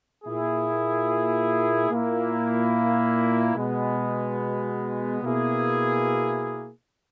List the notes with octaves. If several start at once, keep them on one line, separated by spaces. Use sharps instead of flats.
A#2 A#3 E4 G#4
A#2 A#3 E4
B2 G#3 B3
B2 A#3 E4 G#4